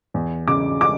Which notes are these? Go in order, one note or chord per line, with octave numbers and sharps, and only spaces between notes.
E2
C#3 D6
D6